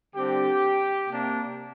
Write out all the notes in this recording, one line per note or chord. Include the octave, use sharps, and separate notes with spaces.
D3 G3 C4 G4
C3 A#3 D4